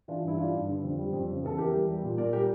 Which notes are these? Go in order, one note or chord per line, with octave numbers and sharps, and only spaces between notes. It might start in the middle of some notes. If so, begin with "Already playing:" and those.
E3 D4 F4
G2 E4
G3 D4 F4
G2
D3
F2
G3
F2
C#3
E2 A4
E3 G4 A#4
G3
G3
A#2
A#2 A#4 D5
G3 G4 A#4